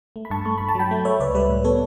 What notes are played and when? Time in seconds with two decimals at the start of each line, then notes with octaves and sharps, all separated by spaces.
0.16 A3
0.25 B5
0.30 G2 A5 C#6
0.45 A3 C#6
0.58 G2 B5
0.68 A5
0.75 F#3 G5 B5
0.91 A3
1.05 A3 C#5 E5
1.20 C#2 B4 D5
1.35 G3 B4
1.49 A2
1.64 B3 A4 C#5